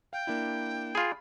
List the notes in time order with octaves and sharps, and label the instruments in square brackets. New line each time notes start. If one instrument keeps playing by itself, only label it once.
[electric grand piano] F5 [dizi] G5
[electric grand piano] A#3 D4 E4
[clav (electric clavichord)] F4 G#4 [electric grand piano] B5